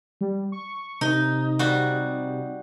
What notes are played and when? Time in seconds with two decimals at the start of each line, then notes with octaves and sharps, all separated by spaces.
0.21 G3
0.52 C#6
1.01 C3 D#4
1.59 G3 F#4